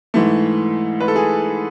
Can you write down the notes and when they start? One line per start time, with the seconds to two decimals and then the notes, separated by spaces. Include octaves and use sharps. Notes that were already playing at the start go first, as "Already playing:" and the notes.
0.14 G#2 E3 A3
1.00 B4
1.08 A4
1.16 G#4